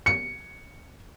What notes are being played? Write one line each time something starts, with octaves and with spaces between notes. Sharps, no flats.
C#7